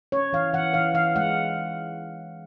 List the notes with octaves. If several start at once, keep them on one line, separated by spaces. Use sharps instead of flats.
C#4 C#5
E3 F5
E3 F#5
E3 F5
E3 F5
G#3 F#5